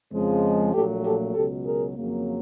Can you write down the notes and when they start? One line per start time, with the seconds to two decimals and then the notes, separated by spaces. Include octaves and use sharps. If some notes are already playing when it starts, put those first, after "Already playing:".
0.12 F2 C#3 F3 G#3
0.73 A#1 A#2 F#3 A3 G4 A4
1.04 G4 A4
1.34 C#2 B2 F#3 G4 A4
1.65 G#4 A#4
1.96 F2 C#3 F#3 A#3